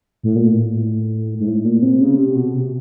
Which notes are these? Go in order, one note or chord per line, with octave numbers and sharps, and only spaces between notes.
A2
A#2
A2
G#2
A2
A#2
C3
C#3
C3
B2
C3